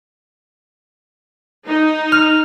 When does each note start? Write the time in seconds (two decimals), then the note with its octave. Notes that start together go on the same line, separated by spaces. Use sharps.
1.67 D#4
2.12 F6